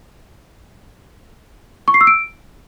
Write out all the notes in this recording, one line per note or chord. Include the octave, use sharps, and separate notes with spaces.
C#6
C7
E6
D7